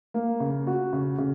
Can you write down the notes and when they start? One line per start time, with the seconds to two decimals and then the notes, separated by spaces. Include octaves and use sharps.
0.14 A#3
0.40 C#3
0.67 F#4
0.93 C#3
1.18 C#3